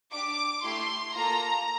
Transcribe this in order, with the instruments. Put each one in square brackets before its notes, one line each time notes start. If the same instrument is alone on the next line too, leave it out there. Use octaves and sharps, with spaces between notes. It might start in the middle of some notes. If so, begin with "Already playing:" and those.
[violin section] D4 G4 D6
A3 E4 G4 C6
A#3 F4 A4 A#5